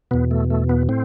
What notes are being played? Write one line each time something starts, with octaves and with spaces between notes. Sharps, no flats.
E2 B2 B3
A3
A3
B3
A2 C4